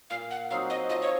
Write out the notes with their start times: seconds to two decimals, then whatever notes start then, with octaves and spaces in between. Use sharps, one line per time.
0.10 A#2 F5
0.31 F#5
0.50 F#3 C4 D#4 F5
0.70 D#5
0.89 F3 D#5
1.02 C#5